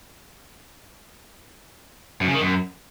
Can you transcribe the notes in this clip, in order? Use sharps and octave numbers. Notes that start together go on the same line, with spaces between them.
F#2
C#3
D#3
F#2